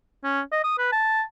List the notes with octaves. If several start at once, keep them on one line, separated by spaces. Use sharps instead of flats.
C#4
D#5
D#6
B4
A5